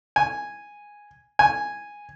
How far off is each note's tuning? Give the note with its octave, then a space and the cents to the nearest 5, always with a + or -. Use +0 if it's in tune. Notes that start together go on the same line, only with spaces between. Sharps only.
G#5 -5
G#5 -5